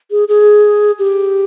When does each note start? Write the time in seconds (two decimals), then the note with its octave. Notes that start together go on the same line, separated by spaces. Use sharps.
0.11 G#4
0.28 G#4
0.99 G4